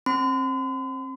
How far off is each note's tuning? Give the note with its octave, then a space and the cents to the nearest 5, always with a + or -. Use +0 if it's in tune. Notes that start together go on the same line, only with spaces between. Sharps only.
C4 +35 C6 -45